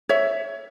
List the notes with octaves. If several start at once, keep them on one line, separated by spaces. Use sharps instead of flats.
C#5 E5